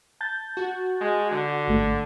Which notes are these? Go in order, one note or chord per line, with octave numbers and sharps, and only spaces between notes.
A5 G6 A6
F#4
G#3
D3
G#1 A3